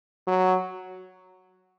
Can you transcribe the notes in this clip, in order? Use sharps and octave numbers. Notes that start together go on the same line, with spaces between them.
F#3